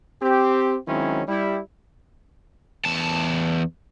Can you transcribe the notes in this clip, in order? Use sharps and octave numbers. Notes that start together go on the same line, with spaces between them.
C4 G4
D#3 F#3 G#3 C4 C#4 E4
G3 E4
E2 A5